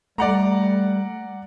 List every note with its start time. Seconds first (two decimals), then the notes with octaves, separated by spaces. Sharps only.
0.18 G3 A3 D5 F#5 A#5